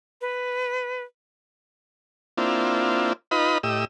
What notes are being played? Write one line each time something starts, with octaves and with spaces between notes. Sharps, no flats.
B4
A#3 C4 D4 E4 F4
D#4 F4 B4 D#5 B5
A2 G4 D#5 E6